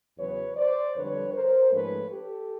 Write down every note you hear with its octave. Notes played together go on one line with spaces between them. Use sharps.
E2 C#3 F#3 B4 C#5
C5 D5
F2 D3 G3 B4 C#5
A#4 C5
G#2 F3 A3 C#4 B4 C#5
G4 A4